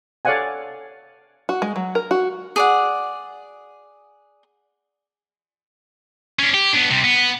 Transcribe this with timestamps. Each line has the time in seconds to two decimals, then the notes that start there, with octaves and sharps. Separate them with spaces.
0.25 A4 C#5 D5 F5 F#5 G#5
1.49 F#4
1.62 G#3
1.76 F#3
1.95 A#4
2.11 F#4
2.56 G#4 D5 F#5
6.39 C#4 D4
6.54 G4
6.73 B3 D4
6.91 C3 G3
7.04 B3